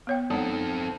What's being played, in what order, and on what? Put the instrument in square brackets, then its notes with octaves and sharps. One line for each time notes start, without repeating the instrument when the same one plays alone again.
[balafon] B3 C#5 G5
[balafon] G#3 D#4 F#5 [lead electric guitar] C4 A4